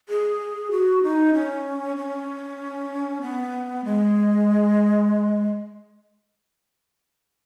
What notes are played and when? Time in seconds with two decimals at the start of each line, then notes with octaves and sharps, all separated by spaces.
0.09 G#4
0.71 F#4
1.03 D#4
1.34 C#4
1.97 C#4
3.21 B3
3.85 G#3